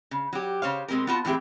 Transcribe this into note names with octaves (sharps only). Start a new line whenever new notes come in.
C#3
F#3 G4
C#3 C5 C#5 F5
B2 G#3 C4 G4 A#4
B3 F4 F#4 A5
A2 E3 C4 G4 G#4 E5